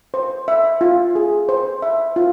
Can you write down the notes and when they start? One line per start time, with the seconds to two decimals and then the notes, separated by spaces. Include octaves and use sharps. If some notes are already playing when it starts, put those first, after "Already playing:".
0.14 C5
0.48 E5
0.81 F4
1.15 G#4
1.49 C5
1.82 E5
2.16 F4